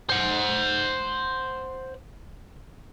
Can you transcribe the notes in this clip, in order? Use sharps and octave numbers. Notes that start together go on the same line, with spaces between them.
C5 F#5